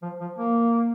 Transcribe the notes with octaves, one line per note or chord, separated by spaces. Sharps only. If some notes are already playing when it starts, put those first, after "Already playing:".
F3
F3
A#3